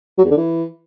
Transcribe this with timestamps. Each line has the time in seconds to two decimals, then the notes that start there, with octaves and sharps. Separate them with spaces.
0.18 F#3
0.24 E2
0.31 D3
0.37 E3